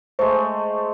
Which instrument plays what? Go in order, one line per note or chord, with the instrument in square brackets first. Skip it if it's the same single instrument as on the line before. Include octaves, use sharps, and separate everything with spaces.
[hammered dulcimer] G#3 A3 [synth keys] C5